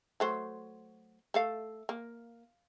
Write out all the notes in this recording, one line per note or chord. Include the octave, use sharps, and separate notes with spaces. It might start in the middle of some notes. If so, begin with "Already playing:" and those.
F#3 A3 C5
A3 A4 F5
A#3